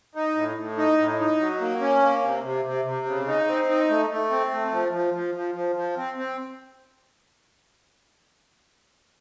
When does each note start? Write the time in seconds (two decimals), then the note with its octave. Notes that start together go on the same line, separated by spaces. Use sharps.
0.15 D#4
0.35 A2
0.57 A2
0.78 D#4
0.98 A2
1.19 D#4
1.40 F#3
1.60 A#3
1.81 C#4
2.02 A#3
2.23 C3
2.43 C3
2.65 C3
2.85 C3
3.06 C#3
3.27 D#4
3.47 C4
3.69 D#4
3.89 A3
4.10 A3
4.30 C4
4.51 A3
4.71 F3
4.92 F3
5.14 F3
5.35 F3
5.55 F3
5.75 F3
5.97 C4
6.17 C4